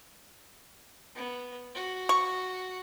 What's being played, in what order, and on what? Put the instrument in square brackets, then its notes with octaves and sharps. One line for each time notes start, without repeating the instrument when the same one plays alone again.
[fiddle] B3
F#4
[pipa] C#6